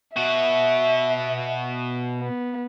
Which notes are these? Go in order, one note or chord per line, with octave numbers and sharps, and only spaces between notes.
B2 F#4 E5
B3